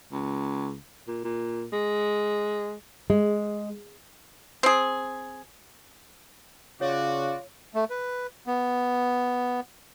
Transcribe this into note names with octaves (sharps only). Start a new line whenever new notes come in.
C#2
A#2
A#2
G#3
G#3
C4 G#4
C#3 F4 F#4 C#5 D5
A3
B4
B3